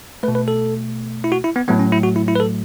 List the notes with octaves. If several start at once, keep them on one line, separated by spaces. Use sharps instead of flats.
B2 A3 B4
B4
A4
E4
F#4
E4
B3
A2 F#3 A3 B3
C#4
E4
F#4
E4
E4
B4
A4